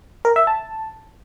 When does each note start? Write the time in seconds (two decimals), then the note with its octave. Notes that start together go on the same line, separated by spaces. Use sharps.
0.25 A#4
0.36 E5
0.47 A5